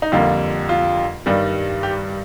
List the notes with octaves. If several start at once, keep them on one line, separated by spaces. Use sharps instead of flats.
D#4
F2 D3 G3 A#3 F4
F4
G2 D#3 G3
G4